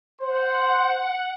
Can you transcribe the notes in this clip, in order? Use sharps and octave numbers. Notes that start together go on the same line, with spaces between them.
C5 F#5